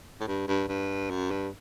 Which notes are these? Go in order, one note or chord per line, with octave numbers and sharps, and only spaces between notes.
A2
G2
G2
G2
F#2
G2